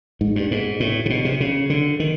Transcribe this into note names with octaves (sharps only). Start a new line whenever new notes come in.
G#2
G2
G#2
A2
C3
B2
C3
C#3
D3
D#3